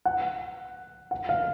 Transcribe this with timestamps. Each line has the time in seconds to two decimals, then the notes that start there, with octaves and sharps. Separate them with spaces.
0.05 F#5
1.11 F#5
1.29 F5